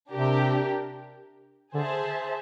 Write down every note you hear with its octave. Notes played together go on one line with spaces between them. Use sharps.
C3 D4 G4 A#4
D3 G#4 C5 E5 A5